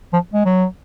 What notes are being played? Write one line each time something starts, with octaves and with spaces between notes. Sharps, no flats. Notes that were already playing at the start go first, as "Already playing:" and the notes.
F3
G#3
F#3